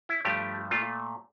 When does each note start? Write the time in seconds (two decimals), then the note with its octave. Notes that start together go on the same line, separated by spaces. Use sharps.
0.09 E4
0.25 G2 F3 A3 G4
0.71 A#2 A3 F4